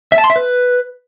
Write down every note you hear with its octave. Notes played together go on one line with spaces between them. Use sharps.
E5
A5
C6
E5
B4